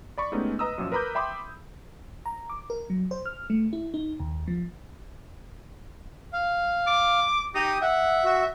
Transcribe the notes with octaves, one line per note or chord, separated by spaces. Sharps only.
D5 B5 C#6
G#3 A3 B3 C#4 D#4 G4
B4 D#5 A#5 D#6 E6
F#2 A#2 F3
A#4 B4 A#5 B5 D6 G6
E5 G5 B5 C6 D6 D#6
A#5
D6
A#4
F#3
C5
F6
A3
E4
D#4
D#2
F3
F5
D6
D#4 G4 D#6
E5 F#5
F#4